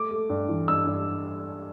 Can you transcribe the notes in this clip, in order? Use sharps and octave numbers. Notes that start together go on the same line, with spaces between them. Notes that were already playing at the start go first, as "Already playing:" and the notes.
Already playing: A3 D6
A3
G2
E3
G2 E6
G2